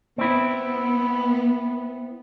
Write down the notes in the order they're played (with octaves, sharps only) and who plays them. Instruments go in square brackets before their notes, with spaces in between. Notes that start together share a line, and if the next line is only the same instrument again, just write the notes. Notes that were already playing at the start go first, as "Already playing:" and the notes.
[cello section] B3 [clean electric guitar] C4 E4